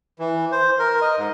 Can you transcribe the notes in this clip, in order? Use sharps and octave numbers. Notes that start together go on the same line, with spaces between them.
E3
C5
A#4
D#5
G#2